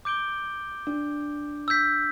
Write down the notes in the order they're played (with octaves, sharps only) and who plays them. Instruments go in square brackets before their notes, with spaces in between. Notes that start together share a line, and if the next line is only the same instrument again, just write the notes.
[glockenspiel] D6 G6 D7 G7
[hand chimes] D4
[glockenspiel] E6 G6 B6